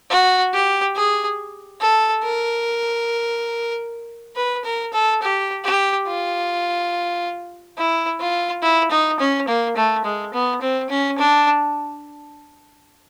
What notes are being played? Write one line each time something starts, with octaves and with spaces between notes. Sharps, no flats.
F#4
G4
G#4
A4
A#4
B4
A#4
A4
G4
G4
F4
E4
F4
E4
D#4
C#4
A#3
A3
G#3
B3
C4
C#4
D4